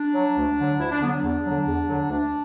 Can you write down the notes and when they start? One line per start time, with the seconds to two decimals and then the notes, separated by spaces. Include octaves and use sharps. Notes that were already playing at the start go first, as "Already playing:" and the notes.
Already playing: D4
0.14 F#3
0.36 D2
0.59 D3 F#3
0.79 D2 E4
0.91 D4
1.01 D3 F#3 B3
1.12 D4
1.23 E2
1.45 D3 F#3
1.67 E2
1.88 D3 F#3
2.09 D2 D4